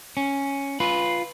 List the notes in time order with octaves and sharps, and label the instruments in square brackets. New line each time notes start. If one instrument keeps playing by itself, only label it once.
[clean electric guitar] C#4
F4 B4